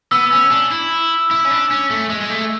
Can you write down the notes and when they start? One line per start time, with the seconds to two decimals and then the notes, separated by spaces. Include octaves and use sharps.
0.12 B3 E6
0.32 C#4
0.51 D4
0.72 E4
1.31 E4
1.45 C#4
1.51 D4
1.71 C#4
1.91 A3
2.10 G#3
2.21 G#3
2.30 A3